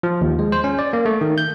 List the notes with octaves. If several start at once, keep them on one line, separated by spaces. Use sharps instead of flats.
F3
D#2
G#3
C5
C#4
D5
A#3
A3
D#3
G6